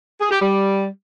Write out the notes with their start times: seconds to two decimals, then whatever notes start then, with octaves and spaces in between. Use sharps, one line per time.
0.21 G#4
0.31 G4
0.41 G3